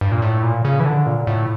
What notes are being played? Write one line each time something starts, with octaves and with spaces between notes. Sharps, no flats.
G2
A#2
A2
A#2
C#3
E3
D3
A#2
A2